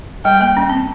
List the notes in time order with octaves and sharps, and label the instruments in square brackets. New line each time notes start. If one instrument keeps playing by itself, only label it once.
[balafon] G3 [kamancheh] G5
[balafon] A#3
C#4
C4